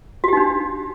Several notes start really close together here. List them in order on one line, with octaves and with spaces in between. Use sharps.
F#4 G4 D#4 D4